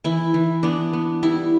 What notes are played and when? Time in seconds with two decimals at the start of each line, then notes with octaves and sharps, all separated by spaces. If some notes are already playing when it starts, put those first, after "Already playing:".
0.04 E3 E4
0.34 E3
0.63 B3 D4
0.93 B3
1.23 G3 E4